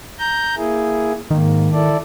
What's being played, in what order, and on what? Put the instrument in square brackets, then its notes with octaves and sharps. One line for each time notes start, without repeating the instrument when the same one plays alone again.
[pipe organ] A#5 G6
A#3 E4 G#4
[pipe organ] G#2 A#3 [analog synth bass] D#3
[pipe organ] E4 A4 D5